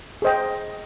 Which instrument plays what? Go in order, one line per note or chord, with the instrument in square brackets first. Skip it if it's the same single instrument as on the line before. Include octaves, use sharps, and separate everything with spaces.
[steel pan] G#4 C5 D#5 G5